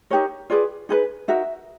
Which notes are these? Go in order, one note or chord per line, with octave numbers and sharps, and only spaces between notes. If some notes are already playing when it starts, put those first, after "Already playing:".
D#4 G4 A#4 C#5
F4 G#4 B4 D5
D#4 G#4 B4
D#4 F#4 A#4 E5